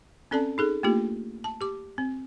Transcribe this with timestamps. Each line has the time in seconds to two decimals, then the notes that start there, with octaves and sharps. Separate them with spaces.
0.31 C4 C#4 A4 D5 A5
0.58 D#4 G#4 A4
0.83 A3 A#3 D4 F4 G4
1.44 A5
1.61 G4 D6
1.98 C4